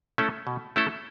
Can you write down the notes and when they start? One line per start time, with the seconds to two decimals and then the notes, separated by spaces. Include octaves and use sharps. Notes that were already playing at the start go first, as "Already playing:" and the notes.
0.18 A3 C#4 E4 A4
0.47 B2
0.76 A3 C#4 E4 A4